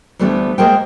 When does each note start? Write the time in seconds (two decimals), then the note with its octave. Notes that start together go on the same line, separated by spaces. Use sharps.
0.19 D2 E3 G3 A3 B3 D4
0.58 G#3 A#3 G#4 A#4 C5 G5